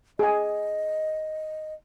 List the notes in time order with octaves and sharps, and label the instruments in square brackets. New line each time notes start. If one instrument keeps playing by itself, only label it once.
[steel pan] G#4 G#5 [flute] D#5